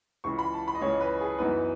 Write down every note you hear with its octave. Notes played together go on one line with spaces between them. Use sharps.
C#2 C#3 E3 C#6
B5
A5
B5
D#5
C#2 C#3 E3 C#5
B4
G#4
F#2 E3 B3 D#4 B4